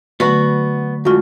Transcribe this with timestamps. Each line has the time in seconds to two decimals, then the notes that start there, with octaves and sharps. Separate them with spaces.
0.20 D3 F#3 A3 B3 F#4 B4
1.05 F2 D3 G#3 F4 F#4